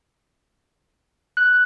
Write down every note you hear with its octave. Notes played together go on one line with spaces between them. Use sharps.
F#6